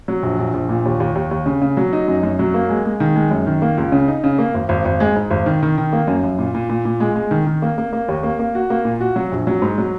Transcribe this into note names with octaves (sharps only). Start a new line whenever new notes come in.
F#3
A#1
A#1
A#1
A#2
D#2
D#2
D#2
D#2
C#3
C#3
F#3
D#4
F#2
F#2
F#3
A#3
G#3
G#3
D#3
G#3
F#2
D#3
A#3
C#2
C#3
D#4
C#3
A#3
G#1
G#1
G#1
G#3
G#2
G#1
D#3
D#3
D#3
A#3
F#2
F#2
A#2
A#2
A#2
A#2
G#3
G#3
D#3
D#3
A#3
A#3
A#3
D#2
A#3
A#3
F#4
A#3
A#2
F#4
F#3
A#1
F#3
G#2
F#3